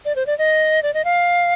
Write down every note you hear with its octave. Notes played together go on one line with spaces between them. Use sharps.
D5
C5
D5
D#5
D5
D#5
F5